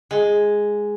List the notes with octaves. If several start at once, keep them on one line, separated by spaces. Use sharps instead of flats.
G#3